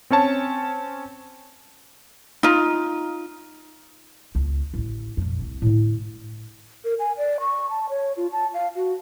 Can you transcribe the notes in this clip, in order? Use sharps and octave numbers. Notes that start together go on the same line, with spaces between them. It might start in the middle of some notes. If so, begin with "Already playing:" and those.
C4 C#4 C#5 A5
D#4 F4
C#2 B3
A1 D2
F2 A#2
C2 C4
A2 D3
A#4
G#5
D5
C#6
A5
C#5
F4
A5
F5
F#4